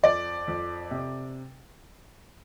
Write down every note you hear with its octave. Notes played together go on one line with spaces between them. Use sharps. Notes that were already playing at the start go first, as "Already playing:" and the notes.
F2 D5
F2
C3